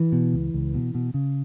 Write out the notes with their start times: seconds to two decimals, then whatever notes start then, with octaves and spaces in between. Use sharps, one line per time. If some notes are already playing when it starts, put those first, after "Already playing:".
Already playing: E3
0.12 B2
0.33 C#2
0.54 C#2
0.74 B2
0.95 B2
1.14 C#3